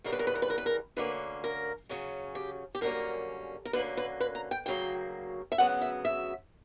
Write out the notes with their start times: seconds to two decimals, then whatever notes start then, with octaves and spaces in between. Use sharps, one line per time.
0.04 E2 C#3 E3 G3 A#4
0.12 B4
0.19 A#4
0.27 B4
0.35 A#4
0.42 B4
0.50 A#4
0.58 B4
0.66 A#4
0.96 D2 D3 A#3 C#4 B4
1.44 A#4
1.89 C#3 F#3 C#4
2.35 G4
2.75 G4
2.81 F#2 D3 G3 A#3 C#4 A#4
3.65 A#4
3.73 D2 D3 A#3 C#4 B4
3.97 B4
4.20 B4
4.35 A#5
4.51 G5
4.66 D2 C#3 F#3 A#3 G5
5.52 E5
5.58 D2 C#3 F#3 B3 F#5
5.82 E5
6.05 E5